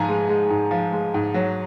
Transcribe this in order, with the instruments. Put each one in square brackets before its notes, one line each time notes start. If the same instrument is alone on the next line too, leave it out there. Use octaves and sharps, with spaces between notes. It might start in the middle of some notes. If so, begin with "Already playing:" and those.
Already playing: [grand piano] G#2 F3 G#5 A#5
G#3
G#3
G#2
F3
G#3
G#2
F#3